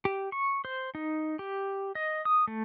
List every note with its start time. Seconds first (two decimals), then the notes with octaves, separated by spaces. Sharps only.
0.05 G4
0.32 C#6
0.65 C5
0.95 D#4
1.39 G4
1.95 D#5
2.25 D#6
2.48 A3